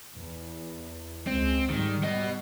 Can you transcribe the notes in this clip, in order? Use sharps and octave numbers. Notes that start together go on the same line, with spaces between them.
E2
C#2 G#3 C4
G#2 D#3 G3
B3 D#5